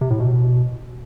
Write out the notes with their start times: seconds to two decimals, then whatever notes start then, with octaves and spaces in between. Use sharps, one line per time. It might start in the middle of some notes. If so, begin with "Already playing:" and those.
0.01 C3
0.10 A2
0.20 B2